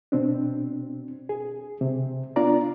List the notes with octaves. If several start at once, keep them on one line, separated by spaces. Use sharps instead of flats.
B2 C4 D4
G#4
C3
B3 D4 F4 D5 A#5